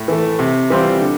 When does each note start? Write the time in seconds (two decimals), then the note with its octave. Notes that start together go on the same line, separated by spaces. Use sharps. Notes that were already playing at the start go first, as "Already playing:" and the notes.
Already playing: A2
0.08 E3 A3
0.39 C3
0.70 E3 G3 C4 F4
1.01 D3